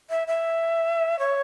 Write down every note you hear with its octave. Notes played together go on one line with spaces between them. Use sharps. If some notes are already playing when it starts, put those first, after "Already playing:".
E5
E5
C#5